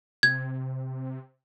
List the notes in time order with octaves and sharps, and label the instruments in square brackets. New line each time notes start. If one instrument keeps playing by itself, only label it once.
[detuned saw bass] C3 [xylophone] G#6